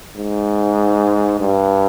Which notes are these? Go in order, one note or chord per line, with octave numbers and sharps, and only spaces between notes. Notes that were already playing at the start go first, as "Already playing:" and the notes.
G#2
G2